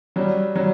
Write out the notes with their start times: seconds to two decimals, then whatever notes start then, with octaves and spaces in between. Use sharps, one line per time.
0.16 F#3 G3
0.56 F#3 G3